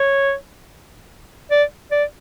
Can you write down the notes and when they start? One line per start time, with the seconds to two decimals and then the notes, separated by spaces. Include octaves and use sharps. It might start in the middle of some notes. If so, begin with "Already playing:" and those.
Already playing: C#5
1.51 D5
1.91 D5